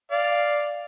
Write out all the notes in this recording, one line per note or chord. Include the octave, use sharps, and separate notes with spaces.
D5 F5